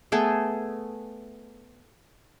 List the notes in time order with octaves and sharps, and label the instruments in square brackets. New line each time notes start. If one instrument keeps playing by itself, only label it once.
[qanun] A3 B3 G#4 A4